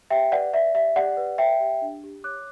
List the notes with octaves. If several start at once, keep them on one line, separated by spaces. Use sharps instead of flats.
G4 E5 G5
B4 D5 F#5
D5 E5
G4 E5
G4 D5 F#5
B4
D5 E5 G5
G4
D4
G4
C#5 D6 F#6